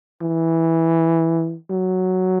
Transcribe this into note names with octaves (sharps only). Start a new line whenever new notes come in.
E3
F#3